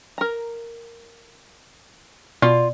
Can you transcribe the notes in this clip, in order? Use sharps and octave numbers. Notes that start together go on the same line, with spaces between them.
A#4 A#5
B2 F4 D5